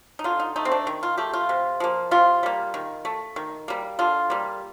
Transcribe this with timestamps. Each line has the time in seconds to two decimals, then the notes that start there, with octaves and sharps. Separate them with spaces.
0.19 D#4
0.24 D3 F4
0.40 D#4
0.56 A3 D#4
0.65 C4
0.72 D4
0.87 D#3
1.03 F4
1.17 A3 G4
1.33 F4
1.49 C3
1.80 F3 A#3
2.11 C3 F4
2.43 G3 A#3
2.74 D#3
3.05 A3
3.36 D#3
3.68 G3 A#3
3.99 D3 F4
4.30 G3 A#3